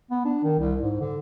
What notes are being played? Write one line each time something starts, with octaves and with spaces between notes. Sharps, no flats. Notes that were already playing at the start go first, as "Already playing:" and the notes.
B3
D4
D#3
C2
G#2
D3